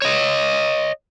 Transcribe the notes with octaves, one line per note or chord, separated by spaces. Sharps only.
C#5 D#5